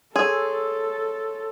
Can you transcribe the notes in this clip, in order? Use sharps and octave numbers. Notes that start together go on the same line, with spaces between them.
G#4 A4 C#5 C6 E6